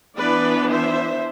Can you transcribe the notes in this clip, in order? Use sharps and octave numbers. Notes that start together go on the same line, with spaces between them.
E3 B3 D4 B4 D5
C5 E5